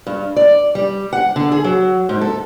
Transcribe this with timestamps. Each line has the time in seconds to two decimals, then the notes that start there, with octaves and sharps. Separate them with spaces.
0.07 G2
0.36 D5
0.75 G3
1.13 F#5
1.36 D3
1.52 G#4
1.64 F#3
2.09 G#2
2.21 A4